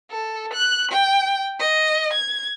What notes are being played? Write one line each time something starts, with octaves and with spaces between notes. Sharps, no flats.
A4
F#6
G5
D#5
G#6